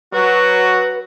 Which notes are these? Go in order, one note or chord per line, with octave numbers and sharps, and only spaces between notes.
F#3 F#4 B4